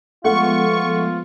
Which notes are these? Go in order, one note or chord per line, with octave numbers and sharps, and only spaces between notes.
F3 G#3 A3 B3 F4 F#5 C#6